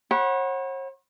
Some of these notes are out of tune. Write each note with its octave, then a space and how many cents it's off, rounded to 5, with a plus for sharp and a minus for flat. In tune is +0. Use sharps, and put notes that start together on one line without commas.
C#5 -45 F#5 +0 B5 -25